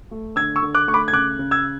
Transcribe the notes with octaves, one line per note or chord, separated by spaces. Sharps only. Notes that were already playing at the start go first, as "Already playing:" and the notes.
A3
D3 E6 G#6
C#6 E6
D3
D6 F#6
A3 C#6
B5 D6
G#6
C#3 D6 F#6
C#3
E6 G#6